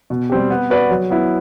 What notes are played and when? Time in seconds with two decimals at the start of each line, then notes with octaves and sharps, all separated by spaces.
0.10 B2
0.30 G3 C4 G4
0.50 B3
0.70 F#4 B4 D5
0.90 F#3
1.10 B3 E4